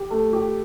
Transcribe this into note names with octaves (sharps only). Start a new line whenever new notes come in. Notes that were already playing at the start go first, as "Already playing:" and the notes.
Already playing: G4
A3
G4